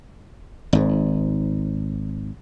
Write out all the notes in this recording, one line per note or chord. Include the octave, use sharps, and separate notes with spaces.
G#1 G#2